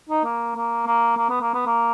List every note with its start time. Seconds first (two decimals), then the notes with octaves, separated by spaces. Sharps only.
0.09 D#4
0.24 A#3
0.55 A#3
0.86 A#3
1.17 A#3
1.29 B3
1.42 A#3
1.54 B3
1.67 A#3